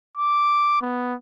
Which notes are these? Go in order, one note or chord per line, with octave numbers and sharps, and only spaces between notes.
D6
B3